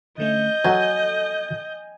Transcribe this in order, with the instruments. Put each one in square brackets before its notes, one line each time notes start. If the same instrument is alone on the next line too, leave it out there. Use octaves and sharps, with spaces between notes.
[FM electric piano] D3 A3 C#4 [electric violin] D#5 G6
[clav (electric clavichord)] F#3 [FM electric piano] A4 [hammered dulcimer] G#5